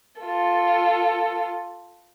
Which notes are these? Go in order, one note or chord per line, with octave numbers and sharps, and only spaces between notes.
F4 A4